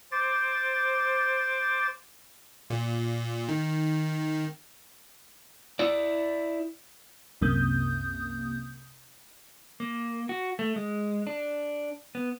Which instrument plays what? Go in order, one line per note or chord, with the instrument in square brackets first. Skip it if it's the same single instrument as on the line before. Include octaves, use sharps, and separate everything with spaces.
[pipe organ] C5 D6 A6
[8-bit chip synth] A#2
D#3
[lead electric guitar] E4 D5
[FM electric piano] C2 F#2 C3 A#3 D#6 G6
[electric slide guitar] A#3
F#4
A3
G#3
D4
B3